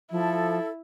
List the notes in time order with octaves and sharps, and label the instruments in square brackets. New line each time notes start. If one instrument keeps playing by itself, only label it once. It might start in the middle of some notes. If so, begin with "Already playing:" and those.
[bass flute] F3 [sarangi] E4 [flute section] A4